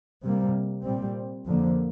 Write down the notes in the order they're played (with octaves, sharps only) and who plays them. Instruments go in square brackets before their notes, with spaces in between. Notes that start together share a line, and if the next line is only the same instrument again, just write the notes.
[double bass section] C3 G3 A#3
A#2 G3 C4
F2 D3 F3 A#3